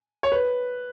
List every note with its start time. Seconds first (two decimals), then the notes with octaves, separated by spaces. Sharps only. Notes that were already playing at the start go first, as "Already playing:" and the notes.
0.23 C#5
0.32 B4